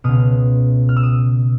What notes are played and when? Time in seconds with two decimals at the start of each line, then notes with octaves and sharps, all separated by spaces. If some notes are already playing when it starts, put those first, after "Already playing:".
0.04 C#2 B2 D#6 F6
0.89 F6
0.96 E6
1.03 D#6